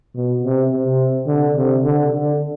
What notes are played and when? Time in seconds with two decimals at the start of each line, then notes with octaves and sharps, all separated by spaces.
0.15 B2
0.43 C3
0.72 C3
1.26 D3
1.56 C3
1.84 D3
2.11 D3